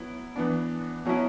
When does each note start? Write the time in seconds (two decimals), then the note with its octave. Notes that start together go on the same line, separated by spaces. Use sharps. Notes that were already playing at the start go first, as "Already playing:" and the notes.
Already playing: F#3 B3 E4
0.36 E3 B3 D4
1.05 B2 F#3 C#4 E4